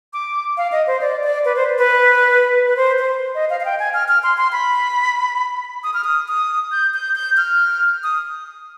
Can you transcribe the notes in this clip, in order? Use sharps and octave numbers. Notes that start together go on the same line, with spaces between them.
D6
F5
D#5
C5
D5
D5
B4
C5
B4
B4
C5
C5
D#5
F5
F5
G5
G#5
F6
F6
C6
C6
B5
D#6
F6
D#6
D#6
G6
G6
G6
F6
D#6